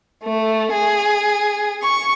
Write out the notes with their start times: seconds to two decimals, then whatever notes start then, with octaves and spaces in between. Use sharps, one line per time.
0.22 A3
0.71 G#4
1.83 C#6